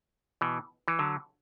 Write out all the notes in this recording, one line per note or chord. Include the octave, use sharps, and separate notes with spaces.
B2 E3
E3
D3 F#3